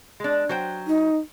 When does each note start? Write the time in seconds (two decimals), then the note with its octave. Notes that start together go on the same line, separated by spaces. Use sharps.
0.20 G#3 D4
0.49 F#3 C5 G5
0.87 D#4